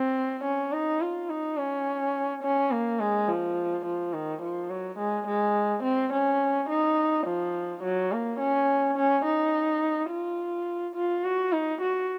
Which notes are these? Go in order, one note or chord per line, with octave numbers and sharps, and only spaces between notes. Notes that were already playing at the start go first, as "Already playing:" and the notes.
Already playing: C4
C#4
D#4
F4
D#4
C#4
C#4
A#3
G#3
F3
F3
D#3
F3
F#3
G#3
G#3
C4
C#4
D#4
F3
F#3
A#3
C#4
C#4
D#4
F4
F4
F#4
D#4
F#4